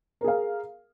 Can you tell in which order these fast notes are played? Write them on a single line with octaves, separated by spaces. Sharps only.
A#4 G#4 F5